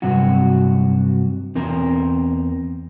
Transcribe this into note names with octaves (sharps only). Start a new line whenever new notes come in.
G2 C3 F#3 F#4
E2 C4 A#4